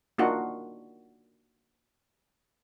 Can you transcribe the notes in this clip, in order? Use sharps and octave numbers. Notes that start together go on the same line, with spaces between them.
A#3 D4 D#4 F4 F#4 F#5